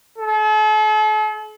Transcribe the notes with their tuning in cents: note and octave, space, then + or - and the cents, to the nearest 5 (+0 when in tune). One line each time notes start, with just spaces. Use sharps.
A4 -45